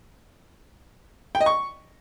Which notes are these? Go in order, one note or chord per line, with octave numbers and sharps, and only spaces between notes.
G5
D#5
C#6